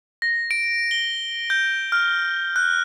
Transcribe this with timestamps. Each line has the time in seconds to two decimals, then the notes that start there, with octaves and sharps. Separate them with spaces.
0.22 A#6
0.51 D7
0.91 G7
1.50 G6
1.92 F6
2.56 F#6